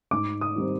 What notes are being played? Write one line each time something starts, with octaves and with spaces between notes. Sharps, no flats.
G#2 D6
D#6
D#3 G3 C4 D#4